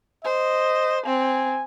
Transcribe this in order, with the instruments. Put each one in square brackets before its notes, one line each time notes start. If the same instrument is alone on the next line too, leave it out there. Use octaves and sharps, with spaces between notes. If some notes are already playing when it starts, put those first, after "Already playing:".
[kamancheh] C5 [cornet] D#5
[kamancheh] C4 [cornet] G#5